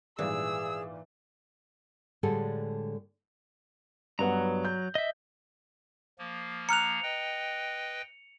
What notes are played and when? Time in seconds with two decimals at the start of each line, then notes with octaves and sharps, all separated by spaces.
0.19 G#1 A#2 E3 G3 G#4 E6
2.23 A2 D3 G3 G#3 G#4 A4
4.19 G2 F#3 B3 F#5 A#5
4.65 G6
4.95 D#5 E5
6.19 F3 A#3
6.69 A#5 F6 F#6 C#7 F7
7.03 B4 D#5 G5